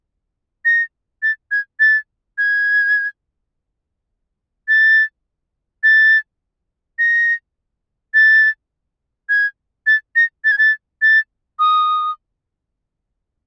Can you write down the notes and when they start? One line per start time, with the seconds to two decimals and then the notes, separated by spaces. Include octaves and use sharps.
0.65 A#6
1.22 A6
1.51 G#6
1.80 A6
2.38 G#6
4.68 A6
5.83 A6
6.99 A#6
8.14 A6
9.29 G#6
9.87 A6
10.16 A#6
10.44 A6
10.52 G#6
10.58 A6
11.02 A6
11.59 D#6